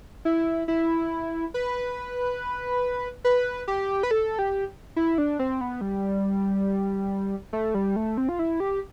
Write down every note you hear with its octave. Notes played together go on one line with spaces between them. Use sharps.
E4
E4
B4
B4
G4
B4
A4
G4
E4
D4
C4
B3
G3
A3
G3
A3
C4
F4
E4
G4